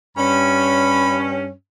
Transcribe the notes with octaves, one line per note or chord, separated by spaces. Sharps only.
G2 C#4 B5